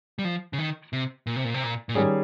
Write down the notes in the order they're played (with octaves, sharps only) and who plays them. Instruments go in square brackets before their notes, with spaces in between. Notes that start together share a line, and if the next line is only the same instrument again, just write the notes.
[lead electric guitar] G3
F3
C#3
D#3
C3
A#2
C3
A#2
C3
A#2
A#2
[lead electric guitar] G#2 [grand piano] D#3 G3 C#4 G#4